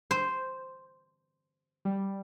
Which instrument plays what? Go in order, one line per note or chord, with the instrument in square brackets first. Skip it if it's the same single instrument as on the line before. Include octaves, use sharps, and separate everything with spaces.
[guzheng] C5
[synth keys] G3